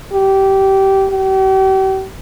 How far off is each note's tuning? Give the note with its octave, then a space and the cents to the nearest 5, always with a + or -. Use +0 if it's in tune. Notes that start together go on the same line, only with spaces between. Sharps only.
G4 -20
G4 -40